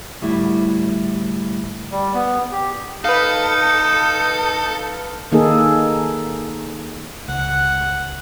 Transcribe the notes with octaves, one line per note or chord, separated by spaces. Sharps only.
D2 A2 G3 E4
G3
B3
G4
D#4 A4 B4 F5
D#3 A#3 D#4 G#4 A4
C#2 F#5